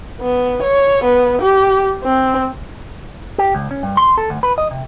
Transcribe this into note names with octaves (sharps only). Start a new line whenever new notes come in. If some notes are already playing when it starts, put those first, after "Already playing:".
B3
C#5
B3
G4
C4
G4
C#2
C#4
G2
C6
A4
D2
B4
D#5
C3